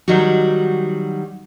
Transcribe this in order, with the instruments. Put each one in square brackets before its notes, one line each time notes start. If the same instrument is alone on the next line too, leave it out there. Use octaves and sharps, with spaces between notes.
[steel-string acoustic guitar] D#3 F#3 G3 D#4 F#4